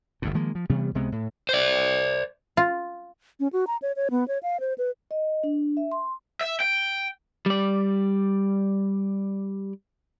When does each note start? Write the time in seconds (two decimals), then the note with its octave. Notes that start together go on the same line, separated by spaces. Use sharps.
0.22 G1 D2 A2
0.34 D#3 F3 G#3 A#3
0.55 F3
0.70 C3 E3 G3 B3
0.95 C#2 C3 G#3 B3
1.12 A2
1.49 C5 D5
2.57 F4
3.40 C#4
3.53 F#4
3.67 A#5
3.82 C#5
3.96 C#5
4.11 B3
4.28 C#5
4.43 F5
4.60 C5
4.78 B4
5.11 D#5
5.44 D4
5.77 E5
5.92 C6
6.41 E5
6.60 G5
7.46 G3 D5